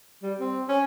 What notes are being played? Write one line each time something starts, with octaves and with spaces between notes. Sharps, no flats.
G3
C4
C#4